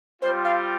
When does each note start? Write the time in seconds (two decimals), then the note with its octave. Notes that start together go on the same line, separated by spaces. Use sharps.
0.22 G3 C4 F4 C5
0.44 F5